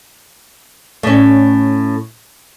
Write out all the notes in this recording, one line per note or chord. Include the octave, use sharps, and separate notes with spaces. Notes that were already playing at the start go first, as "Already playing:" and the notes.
A2 C#4